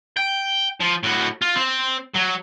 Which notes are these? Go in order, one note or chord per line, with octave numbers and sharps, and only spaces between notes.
G5
F3
A2 F#4
F4
C4
F#3